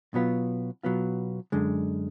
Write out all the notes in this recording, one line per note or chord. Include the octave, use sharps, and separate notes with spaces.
B2 F#3 B3 F4
B2 F#3 B3 F4
F#2 D3 G#3